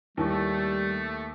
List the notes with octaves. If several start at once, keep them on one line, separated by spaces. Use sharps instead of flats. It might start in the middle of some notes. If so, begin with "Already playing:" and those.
D#2 G3 A3 E4 A5 C#6